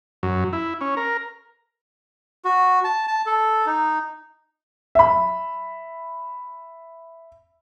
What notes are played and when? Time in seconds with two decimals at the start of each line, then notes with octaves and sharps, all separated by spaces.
0.23 F#2
0.53 E4
0.81 C#4
0.97 A#4
2.45 F#4
2.84 A5
3.07 A5
3.26 A4
3.66 D#4
4.95 E5 B5